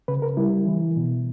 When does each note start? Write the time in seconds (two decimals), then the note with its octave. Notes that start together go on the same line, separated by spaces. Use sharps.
0.08 C#3 B4
0.22 A#4
0.37 G3 E4
0.66 E3
0.97 B2